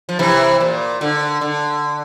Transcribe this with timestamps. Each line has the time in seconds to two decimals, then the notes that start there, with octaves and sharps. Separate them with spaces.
0.09 F3
0.19 C3 E3
0.60 A#2
1.01 D3
1.41 D3